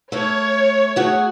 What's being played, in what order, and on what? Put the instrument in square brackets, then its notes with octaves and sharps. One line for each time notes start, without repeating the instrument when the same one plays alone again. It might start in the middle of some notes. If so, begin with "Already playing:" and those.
[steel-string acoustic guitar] A3 A#4 [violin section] C#5
[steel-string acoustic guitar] A3 F#4 G#4